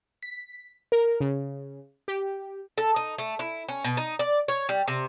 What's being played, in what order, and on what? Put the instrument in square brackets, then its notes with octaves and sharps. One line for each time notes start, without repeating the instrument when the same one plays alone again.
[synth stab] B6
A#4
C#3
G4
[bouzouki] A4
D#4
A3
E4
C#4
B2
D#4
D5
C#5
G3
C3